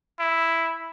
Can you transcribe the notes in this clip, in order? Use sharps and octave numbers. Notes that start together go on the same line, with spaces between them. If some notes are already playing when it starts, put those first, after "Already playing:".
E4